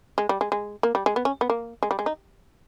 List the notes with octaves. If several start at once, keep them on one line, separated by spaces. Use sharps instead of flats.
G#3
G3
G#3
G#3
A#3
G3
G#3
B3
C#4
B3
A#3
G#3
G3
G#3
D#4